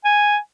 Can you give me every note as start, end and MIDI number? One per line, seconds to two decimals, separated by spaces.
0.05 0.38 80